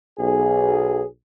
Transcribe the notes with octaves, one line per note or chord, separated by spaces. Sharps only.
B1 G#4